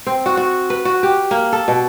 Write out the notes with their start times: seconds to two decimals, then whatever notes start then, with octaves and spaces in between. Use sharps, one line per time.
0.06 C4
0.26 F#4
0.37 F#4
0.70 B4
0.85 F#4
1.03 G4
1.31 A#3
1.53 A4
1.68 B2